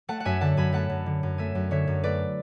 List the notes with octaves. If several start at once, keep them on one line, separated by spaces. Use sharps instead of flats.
A3 F#5 A5
F#5
F#2 E5 G#5
D3 F#5 A5
F#2 G#5 B5
A3 F#5 A5
F#2
D3
F#2
A3 E5 G#5
F#2
D3 C#5 E5
F#2
A3 B4 D5